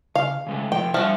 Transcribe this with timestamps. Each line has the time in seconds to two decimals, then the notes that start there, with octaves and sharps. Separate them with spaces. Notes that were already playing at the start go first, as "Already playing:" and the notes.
0.16 C#3 F5
0.47 C#3 G#3 A3
0.72 C3 F3 G5
0.94 D3 F3 G3 F#4 E5